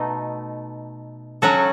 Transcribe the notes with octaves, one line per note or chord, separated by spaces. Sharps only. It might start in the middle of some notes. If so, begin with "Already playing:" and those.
Already playing: B2 A3 D#4
F#3 C#4 F#4 A4